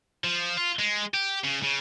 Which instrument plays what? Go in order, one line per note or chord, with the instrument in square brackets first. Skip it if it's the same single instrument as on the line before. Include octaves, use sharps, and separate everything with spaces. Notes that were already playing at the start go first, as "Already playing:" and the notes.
[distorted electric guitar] F3
F4
G#3
G4
C#3
C#3